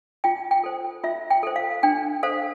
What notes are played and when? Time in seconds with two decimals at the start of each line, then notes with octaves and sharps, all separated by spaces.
0.24 F4 G5
0.51 G5
0.64 A4 C5
1.04 F4 E5
1.30 G5
1.43 A4 C5
1.56 F5
1.83 D4 G5
2.23 A4 C5 F5